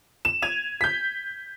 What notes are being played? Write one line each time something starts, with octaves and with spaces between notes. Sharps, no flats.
E7
G#6 D#7 F7
G6 B6